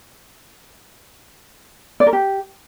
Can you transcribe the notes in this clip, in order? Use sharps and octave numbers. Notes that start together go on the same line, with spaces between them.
D5
A#4
G4